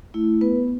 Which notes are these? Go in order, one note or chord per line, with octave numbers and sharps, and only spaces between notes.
A3 E4
B3 B4